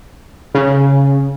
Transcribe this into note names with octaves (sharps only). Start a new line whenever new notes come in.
C#3